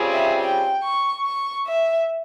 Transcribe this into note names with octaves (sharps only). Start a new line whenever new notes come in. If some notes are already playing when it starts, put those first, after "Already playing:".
Already playing: C#3 G3 C4 F4 G#4
E5
G5
C#6
C#6
E5